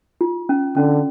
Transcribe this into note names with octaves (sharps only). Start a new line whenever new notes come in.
F4
C#4
D3 C#4